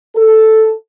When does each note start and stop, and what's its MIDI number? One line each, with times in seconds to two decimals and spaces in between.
0.15 0.71 69